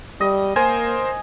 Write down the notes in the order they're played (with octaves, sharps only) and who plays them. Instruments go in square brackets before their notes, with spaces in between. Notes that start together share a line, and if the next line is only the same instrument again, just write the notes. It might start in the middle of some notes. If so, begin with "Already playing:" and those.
[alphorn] G3 [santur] D#5
[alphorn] A#3 [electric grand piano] A#4 C5 C6 [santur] G#5